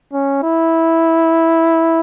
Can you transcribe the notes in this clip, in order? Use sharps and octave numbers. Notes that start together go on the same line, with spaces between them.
C#4
E4